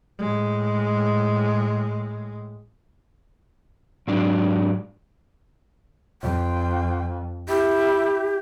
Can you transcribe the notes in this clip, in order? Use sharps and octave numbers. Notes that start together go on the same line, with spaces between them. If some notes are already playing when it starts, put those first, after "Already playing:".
A2 G#3
G#2 F#3 D4
F2 G5
E4 G4